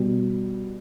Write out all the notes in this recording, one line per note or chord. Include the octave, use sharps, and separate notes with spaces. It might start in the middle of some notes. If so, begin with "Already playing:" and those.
Already playing: B2 G3